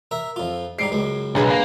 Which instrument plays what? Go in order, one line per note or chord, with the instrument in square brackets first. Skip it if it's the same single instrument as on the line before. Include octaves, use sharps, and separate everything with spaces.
[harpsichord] A#4 E5
F2 F4
[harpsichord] G#2 G3 D#4 [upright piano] C7 D7
[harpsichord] C#2 F#2 G#3
[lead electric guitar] B1 [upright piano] D3 G#4 B4
[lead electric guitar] A#3